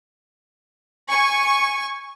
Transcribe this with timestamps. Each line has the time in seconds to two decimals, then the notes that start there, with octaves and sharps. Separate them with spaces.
1.09 G#5 C#6